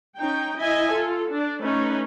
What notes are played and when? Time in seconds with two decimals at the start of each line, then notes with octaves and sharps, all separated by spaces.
0.17 C#4 D#4 G5
0.58 E4 D#5 E5 G#5
0.92 F4 A4
1.29 D4
1.61 A3 C#4 D#4 B4